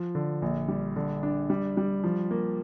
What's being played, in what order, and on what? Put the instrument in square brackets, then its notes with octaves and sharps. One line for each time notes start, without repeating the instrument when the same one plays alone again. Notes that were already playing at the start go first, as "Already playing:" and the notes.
Already playing: [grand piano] F3
D3
A#1
G3
D3
D4
G3
G3
F3
A#3